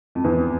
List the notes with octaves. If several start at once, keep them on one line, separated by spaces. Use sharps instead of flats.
F2
E2